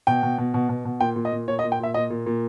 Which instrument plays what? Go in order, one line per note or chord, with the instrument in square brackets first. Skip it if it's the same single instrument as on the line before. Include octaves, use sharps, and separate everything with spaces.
[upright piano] B2 G5
B2
B2
B2
B2
B2
A#2 G5
A#2
D#5
A#2
A#2 C#5
D#5
A#2
G5
A#2 E5
A#2 D#5
A#2
A#2